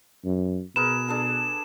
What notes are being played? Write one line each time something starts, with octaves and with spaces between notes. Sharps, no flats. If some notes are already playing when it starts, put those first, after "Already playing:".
F#2
B2 G#4 A#4 B4 E7
D4 G#4 A4